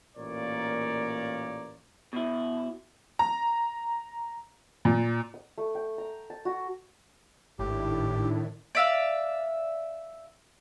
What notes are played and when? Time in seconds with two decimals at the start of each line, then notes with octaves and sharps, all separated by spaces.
0.17 A1 A#2 A#3 A#4 C#5 D5
2.13 B2 E4
3.19 A#5
4.85 A#2
5.34 D#6
5.58 A3
5.75 G5
5.98 A#5
6.30 A5
6.45 F#4
7.59 G#1 A2 D#3 D4 E4 G4
8.75 D5 E5 F5